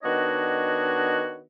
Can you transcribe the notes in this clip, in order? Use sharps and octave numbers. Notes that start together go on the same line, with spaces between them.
D#3 B3 D4 F#4 C#5 D#5